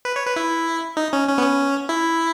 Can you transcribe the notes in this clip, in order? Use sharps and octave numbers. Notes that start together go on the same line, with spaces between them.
B4
C#5
B4
E4
D#4
C#4
C#4
B3
C#4
E4